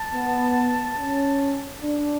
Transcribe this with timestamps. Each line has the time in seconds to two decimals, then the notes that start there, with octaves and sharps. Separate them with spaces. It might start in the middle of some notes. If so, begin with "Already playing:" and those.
Already playing: A5
0.14 B3
0.97 C#4
1.81 D4